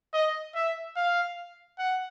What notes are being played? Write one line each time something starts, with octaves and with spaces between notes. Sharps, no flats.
D#5
E5
F5
F#5